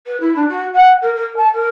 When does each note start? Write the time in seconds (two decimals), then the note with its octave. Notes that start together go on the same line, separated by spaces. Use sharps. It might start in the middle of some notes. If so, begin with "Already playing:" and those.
0.07 B4
0.20 E4
0.36 D4
0.49 F#4
0.74 F#5
1.02 A#4
1.15 A#4
1.37 A5
1.54 A#4